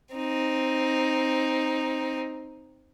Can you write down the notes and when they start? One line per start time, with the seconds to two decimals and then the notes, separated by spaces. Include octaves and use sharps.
0.14 C4 D#4